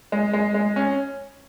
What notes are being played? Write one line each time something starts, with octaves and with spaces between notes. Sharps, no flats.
G#3
G#3
G#3
C#4